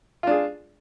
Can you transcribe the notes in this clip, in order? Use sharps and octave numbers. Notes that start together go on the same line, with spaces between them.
D4 F4 G#4